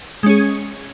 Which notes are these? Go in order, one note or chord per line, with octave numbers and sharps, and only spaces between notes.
G#3 C#4 G#4